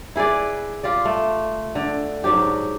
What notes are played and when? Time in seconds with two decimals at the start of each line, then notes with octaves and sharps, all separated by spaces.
0.16 E4 G#4 B4 D5
0.83 F4 G4 D5
1.05 A3
1.75 D3
2.24 G#2 F#3 D4 G4